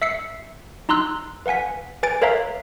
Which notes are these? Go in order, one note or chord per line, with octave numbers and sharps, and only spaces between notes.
E5 E6 C7 C#7
D#4 A#5 C6 E6 F#6
B4 F5 F#5 G#5 B6
B4 G#5 A6 D7
A#4 B4 C#5 E5 F5 A#5